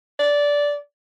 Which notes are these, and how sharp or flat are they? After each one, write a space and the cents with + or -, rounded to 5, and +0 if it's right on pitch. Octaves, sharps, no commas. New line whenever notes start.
D5 -15